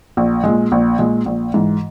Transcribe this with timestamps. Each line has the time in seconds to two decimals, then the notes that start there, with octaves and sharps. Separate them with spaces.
0.17 A#1
0.44 A#2 G#3
0.72 A#1
0.99 A#2 G#3
1.26 A#1
1.54 G#2 E3